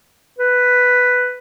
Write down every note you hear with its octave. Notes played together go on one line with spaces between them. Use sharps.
B4